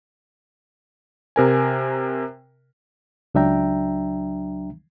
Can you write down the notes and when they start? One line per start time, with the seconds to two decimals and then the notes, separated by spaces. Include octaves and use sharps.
1.36 C3 A#4 G#5
3.34 C#2 F#3 D4 E5 G5 A#5